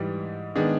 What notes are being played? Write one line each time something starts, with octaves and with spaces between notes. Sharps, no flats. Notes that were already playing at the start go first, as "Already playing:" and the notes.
Already playing: G#2 E3 G3
D#3 G#3 B3 D4